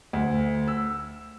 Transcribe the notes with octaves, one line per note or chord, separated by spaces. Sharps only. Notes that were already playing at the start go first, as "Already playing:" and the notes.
D2
E6